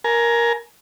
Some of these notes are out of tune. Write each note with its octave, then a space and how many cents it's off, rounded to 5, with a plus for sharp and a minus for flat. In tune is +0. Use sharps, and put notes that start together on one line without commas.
A#4 +10 G#5 +25